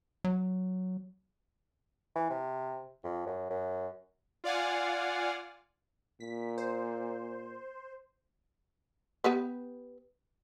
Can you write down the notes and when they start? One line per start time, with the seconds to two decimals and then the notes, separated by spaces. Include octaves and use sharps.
0.24 F#3
2.15 E3
2.30 C3
3.04 F2
3.27 F#2
3.50 F#2
4.44 F4 D5 F5 F#5 G#5
6.20 A#2 B6
6.58 C5
9.24 B3 G4 B4